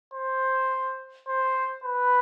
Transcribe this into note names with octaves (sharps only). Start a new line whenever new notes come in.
C5
C5
B4